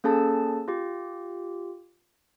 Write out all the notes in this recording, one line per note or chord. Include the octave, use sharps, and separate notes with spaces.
A#3 C#4 G#4 A4 A5
F4 G4